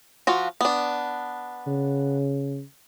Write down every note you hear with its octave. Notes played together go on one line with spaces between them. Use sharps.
F3 F4 F#4
B3 D4
C#3